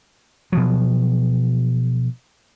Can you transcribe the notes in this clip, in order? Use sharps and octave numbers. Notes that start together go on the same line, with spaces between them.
B2 F3 F#3